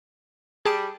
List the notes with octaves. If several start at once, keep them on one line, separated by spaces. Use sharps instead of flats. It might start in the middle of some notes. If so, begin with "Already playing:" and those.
G3 G#4 A5 D7